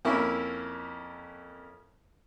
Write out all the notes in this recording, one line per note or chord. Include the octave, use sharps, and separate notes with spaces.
F2 A#3 C#4 E4